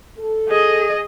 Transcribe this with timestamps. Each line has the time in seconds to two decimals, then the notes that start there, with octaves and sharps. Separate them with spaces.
0.17 A4
0.49 G#4 D#5